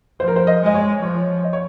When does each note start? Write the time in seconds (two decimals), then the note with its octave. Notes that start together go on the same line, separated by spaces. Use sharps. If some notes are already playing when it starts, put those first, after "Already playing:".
0.20 F3 C5
0.28 A#4
0.36 C5
0.47 D#5
0.62 G#3 D#5
0.74 C#5
1.02 F3 C#5
1.44 D#5
1.53 C#5